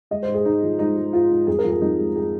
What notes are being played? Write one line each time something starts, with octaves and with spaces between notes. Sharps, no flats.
G#3 D#5
C5
G#2
G#4
G#2 D#4
F3
G#3 D#4
G#3
G#2 F4
G#2
F2 G#4
A#4
F3
G#4
F2 D#4
G#3
G#3 G#4